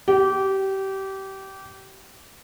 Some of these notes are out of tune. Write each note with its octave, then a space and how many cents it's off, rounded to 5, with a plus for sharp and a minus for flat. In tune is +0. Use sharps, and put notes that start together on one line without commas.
G4 -25